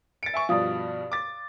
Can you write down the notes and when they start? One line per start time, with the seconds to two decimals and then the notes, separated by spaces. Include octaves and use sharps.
0.23 A6 C#7 D7
0.34 E5 G#5 C#6
0.49 G2 B2 F3 F5 D#6
1.12 D6 A6